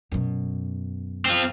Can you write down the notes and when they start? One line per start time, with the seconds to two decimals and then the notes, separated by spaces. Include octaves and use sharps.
0.12 F#2 B2
1.25 C4 F4